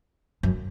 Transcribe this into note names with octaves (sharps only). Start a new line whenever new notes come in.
F#2